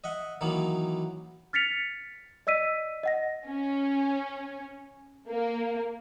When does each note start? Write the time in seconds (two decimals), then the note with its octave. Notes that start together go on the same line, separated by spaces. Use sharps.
0.04 D#5 E5 F#5
0.41 D#3 E3 F#3 A#3 B3
1.53 F6 A6 B6 C#7 F7
2.47 D5 D#5 E6 B6 D#7
3.03 D#5 F#5 A#6
3.47 C#4
5.29 A#3